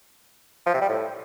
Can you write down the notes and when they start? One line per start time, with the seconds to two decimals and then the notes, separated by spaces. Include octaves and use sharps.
0.66 F3
0.74 C3
0.81 G3
0.89 A2